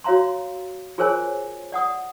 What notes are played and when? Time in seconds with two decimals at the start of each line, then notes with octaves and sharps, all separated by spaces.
0.04 F#4 C#5 F5 A#5 C6
0.98 F4 G#4 A#4 C5 C#5 G#5
1.72 D5 F#5 D#6